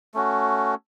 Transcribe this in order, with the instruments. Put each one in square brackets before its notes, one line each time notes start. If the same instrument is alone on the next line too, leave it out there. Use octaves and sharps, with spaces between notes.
[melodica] A3 C#4 F#4